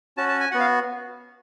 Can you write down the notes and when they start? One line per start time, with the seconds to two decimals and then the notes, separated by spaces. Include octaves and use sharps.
0.17 C#4 F#4 A5
0.29 A5
0.40 G#5
0.51 B3 F#4 F#5
0.60 F5